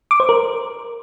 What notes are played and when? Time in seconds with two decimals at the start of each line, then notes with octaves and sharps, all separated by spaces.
0.11 D6
0.20 C5
0.29 A#4